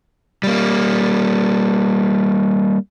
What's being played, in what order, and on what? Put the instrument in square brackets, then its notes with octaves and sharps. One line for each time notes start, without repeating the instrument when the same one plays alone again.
[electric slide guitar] G3 A#3